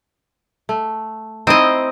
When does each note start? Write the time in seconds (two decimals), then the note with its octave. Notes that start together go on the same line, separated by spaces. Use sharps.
0.69 A3
1.47 C4 D#4 E4 C5 D#5